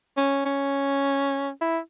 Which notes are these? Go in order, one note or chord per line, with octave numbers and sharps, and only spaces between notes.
C#4
C#4
E4